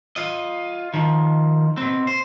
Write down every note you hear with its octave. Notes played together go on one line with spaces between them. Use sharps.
F4 D#5
D#3 F3
B2 C4
C5